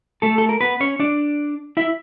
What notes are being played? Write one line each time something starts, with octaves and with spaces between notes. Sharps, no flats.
A3 A4
A4
A#4
B3 B4
C#4 C#5
D4 D5
E4 E5